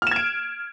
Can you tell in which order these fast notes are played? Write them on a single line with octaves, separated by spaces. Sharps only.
F6 E7 G#6 D7